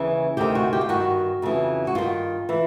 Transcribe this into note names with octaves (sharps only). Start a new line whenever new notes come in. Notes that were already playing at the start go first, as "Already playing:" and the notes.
Already playing: D#2 C#3 E3
D2 C3 D#3 G4
F#4
G4
F4
G2 D#3 F#4
F2 C#3 E3
F#4
G2 D#3 F4
E3